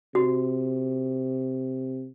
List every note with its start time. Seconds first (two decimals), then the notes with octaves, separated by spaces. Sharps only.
0.15 C3 F#4